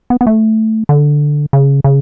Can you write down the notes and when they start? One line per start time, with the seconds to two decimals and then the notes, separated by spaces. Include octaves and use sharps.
0.10 B3
0.21 B3
0.27 A3
0.89 D3
1.53 C#3
1.84 C#3